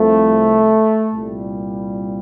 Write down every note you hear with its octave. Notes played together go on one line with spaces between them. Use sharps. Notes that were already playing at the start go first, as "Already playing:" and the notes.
Already playing: C2 C3 F3 A3
C2 A#2 G3